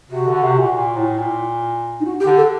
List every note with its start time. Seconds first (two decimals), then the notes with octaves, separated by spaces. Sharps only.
0.10 C3 F#4
0.27 D3
0.43 C3
0.58 A#2
0.75 A#2
0.96 A2
1.18 A#2
2.00 D#4
2.05 F#4
2.20 G4
2.26 D3
2.37 A4